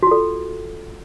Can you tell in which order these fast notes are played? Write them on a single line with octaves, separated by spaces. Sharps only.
F#4 F4 A4